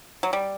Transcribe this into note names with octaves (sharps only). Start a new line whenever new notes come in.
F#3
G3